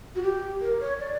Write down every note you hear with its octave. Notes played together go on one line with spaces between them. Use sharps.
F#4
G4
A#4
C#5
D5